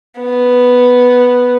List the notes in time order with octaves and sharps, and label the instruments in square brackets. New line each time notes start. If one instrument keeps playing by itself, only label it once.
[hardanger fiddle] B3